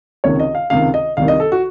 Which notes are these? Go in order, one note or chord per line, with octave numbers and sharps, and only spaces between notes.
C#2 C3 D#3 C#5
D#5
F5
C#2 C3 D#3 F5
D#5
C2 C3 D#3 F5
D#5
A4
F#4